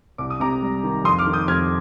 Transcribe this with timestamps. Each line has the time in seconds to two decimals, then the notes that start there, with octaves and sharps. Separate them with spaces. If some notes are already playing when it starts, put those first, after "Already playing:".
0.18 C2 D6
0.30 D#6
0.40 C3 A#5 D6
0.62 G3
0.83 D#3
1.04 F2 C6 D#6
1.19 D6 F6
1.26 D#3
1.33 D#6 G6
1.48 F2 F6 G#6